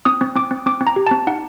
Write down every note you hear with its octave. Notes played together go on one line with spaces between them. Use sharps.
C4 D#6
C4
C4 D6
C4
C4 D6
C4
A#5
G4
C4 A5
D#4 F#5